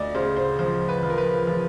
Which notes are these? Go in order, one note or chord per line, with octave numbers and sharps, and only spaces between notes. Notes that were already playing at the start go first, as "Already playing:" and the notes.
Already playing: D2 D5 D#5
C#3 C5
C5
F3 C5
B4
F3
A#4
B4
F3